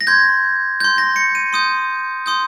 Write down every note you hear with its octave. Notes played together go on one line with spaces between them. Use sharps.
A#6
C6 G6 G#6
C6 G6
A#6
C#7
D#7
C6 D#6 G6 D#7
C6 D#6 G6